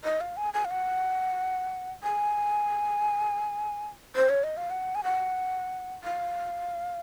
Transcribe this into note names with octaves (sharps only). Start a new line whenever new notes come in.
D#5
F5
G#5
G#5
F5
F#5
G#5
C5
C#5
D#5
F5
F#5
G#5
F#5
F5